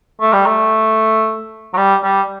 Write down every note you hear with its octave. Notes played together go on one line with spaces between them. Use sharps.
A3
G3
A3
F#3
G3
G3